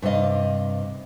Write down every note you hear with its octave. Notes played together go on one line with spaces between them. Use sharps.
G2 C3 D5 D#5 F5